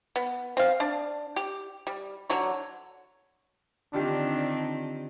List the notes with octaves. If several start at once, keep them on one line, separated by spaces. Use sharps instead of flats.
B3
C4 F5
D4
G4
G3
D3 F#3 C#5
D3 D#3 C4 D4 F4 G4